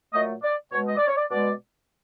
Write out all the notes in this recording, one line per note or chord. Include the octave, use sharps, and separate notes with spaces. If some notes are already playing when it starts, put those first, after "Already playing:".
A#2 F#3 A3 D#5
D5
B2 G#3 C#5
D#5
D5
C#5
D5
B2 G#3 D5